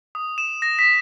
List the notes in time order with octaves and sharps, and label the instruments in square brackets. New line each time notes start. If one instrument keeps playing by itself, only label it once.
[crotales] D#6
E7
A#6
B6